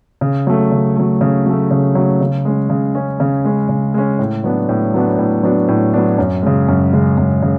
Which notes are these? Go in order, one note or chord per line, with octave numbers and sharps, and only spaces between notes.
C#3
F#3 A3
C#3
F#3 A3
C#3
F#3 A3
C#3
F#3 A3
C#3
G#3 C#4
C#3
G#3 C#4
C#3
G#3 C#4
C#3
G#3 C#4
A2
F#3 B3 D4
A2
F#3 B3 D4
A2
F#3 B3 D4
A2
F#3 B3 D4
F#2
C#3 G#3
F#2
C#3 G#3
F#2
C#3